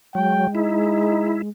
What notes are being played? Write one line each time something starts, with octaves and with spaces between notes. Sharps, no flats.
F#3 G#3 G5
D#4 E4